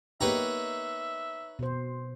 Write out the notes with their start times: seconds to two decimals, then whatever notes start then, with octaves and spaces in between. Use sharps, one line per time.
0.21 A#3 B3 D#4 G4 B4 C#5 E5 A#5
1.59 B2 C5